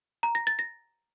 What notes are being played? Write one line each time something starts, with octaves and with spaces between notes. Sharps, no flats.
A#5
A#6
A6
A#6